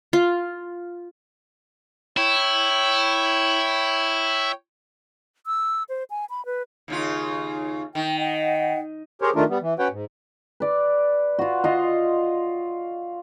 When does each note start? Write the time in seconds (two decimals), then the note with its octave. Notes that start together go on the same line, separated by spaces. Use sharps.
0.13 F4
2.17 E4 C#5 G5
5.46 E6
5.89 C5
6.10 G#5
6.30 B5
6.46 B4
6.88 D#2 C#3 F4
7.95 D#3 G5
8.19 D#5 F#5 G5
9.22 G4 G#4 A#4 C5 C#5
9.35 D#3 A3 D4 F4 A#4
9.49 G3 B3
9.62 E3
9.79 C#4 F#4 B4 C#5 F#5 G5
9.91 G#2
10.60 B4 D5
11.39 F4 F#4
11.64 F4 D#5 C6